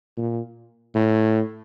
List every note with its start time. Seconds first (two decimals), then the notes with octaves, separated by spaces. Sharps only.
0.18 A#2
0.95 A2